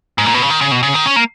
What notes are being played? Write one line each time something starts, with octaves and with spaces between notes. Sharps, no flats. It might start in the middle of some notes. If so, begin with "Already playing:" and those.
G#2
A#2
B2
C#3
D#3
C#3
B2
C#3
D#3
C#4
A#3